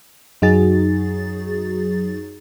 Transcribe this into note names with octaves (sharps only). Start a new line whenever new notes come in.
F#2 F#3 D#4 F#4 G#4 A6